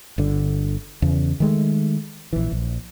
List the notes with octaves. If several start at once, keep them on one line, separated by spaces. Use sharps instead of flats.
G1 D3
E2 C#3
D#3 G#3 A3
A#1 E3
A#1